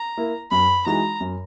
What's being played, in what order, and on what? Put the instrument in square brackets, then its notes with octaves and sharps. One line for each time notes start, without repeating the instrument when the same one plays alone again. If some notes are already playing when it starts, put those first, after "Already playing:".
Already playing: [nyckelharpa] A#5
[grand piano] A#3 E4
[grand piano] F#2 [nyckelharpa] B5
[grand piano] E3 G#3 D#4 F#4 [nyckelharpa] A#5
[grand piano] F#2